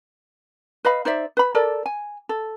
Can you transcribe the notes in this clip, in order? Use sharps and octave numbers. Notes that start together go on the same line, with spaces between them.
B4 D#5 F5 B5
D#4 C5 D5 E5
B4 B5
A4 A#4 D5
G#5
A4